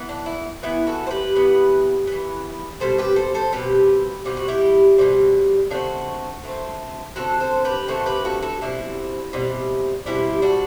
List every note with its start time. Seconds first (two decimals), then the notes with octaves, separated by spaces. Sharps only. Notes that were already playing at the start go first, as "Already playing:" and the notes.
Already playing: E3 B3
0.09 D4
0.26 E4
0.63 E3 B3 E4
0.87 F#4 A4
1.07 C5
1.11 G4 B4
1.35 E3 B3
2.07 E3 B3
2.80 B2 G3 C4 A4 C5
2.98 G4 B4
3.16 A4 C5
3.34 A4 C5
3.52 B2 G3 C4 G4 B4
4.25 B2 G3 C4 G4
4.37 F#4
4.48 E4 G4
4.98 B2 G3 C4
5.70 D3 A3 C4 D4 F#4
6.43 D3 A3 C4
7.16 D3 A3 C4 F#4 A4
7.40 A4 C5
7.65 G4 B4
7.88 D3 A3 C4 F#4 A4
8.06 G4 B4
8.25 F#4 A4
8.42 F#4 A4
8.61 B2 G3 C4 E4
9.33 B2 G3 C4
10.06 B2 G3 C4 E4 G4
10.42 D4 F#4